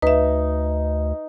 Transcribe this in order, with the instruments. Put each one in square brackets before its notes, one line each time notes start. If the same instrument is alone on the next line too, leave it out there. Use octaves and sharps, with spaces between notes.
[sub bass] D2 [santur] D#4 [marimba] B4 E5